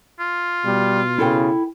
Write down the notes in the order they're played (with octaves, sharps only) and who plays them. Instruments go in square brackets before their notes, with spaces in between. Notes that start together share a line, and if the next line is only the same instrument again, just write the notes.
[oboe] F4
[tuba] B2 [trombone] G3
[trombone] C#3 [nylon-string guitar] E4 A4 G5